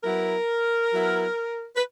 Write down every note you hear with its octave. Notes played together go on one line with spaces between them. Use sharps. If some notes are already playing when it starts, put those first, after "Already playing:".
F#3 B3 E4 A#4
F#3 B3 E4
B4